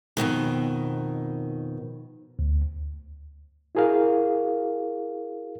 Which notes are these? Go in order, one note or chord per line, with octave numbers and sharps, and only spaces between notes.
F2 G#2 B2 D#3
D2
E4 F#4 G#4 A#4 F5